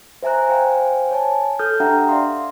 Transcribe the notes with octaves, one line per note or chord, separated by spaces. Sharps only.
C5 E5 G#5 A#5 F#6
C5 F5 G5 G#5
C#5 G#5 A5
A4 D#6 F6 G6
D4 G4 E5 F#5 G5 A#5
D5 E5 F5 C6